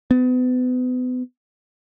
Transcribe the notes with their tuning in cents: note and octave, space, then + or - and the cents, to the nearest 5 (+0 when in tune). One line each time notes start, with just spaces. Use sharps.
B3 +35